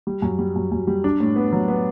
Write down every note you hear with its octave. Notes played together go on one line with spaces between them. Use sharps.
G3
F#2
G3
F#2
F#2
G3
D4
A2
B3
F#3
B3